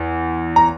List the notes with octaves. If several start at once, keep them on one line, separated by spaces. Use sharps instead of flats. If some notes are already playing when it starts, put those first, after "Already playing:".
Already playing: E2
A#5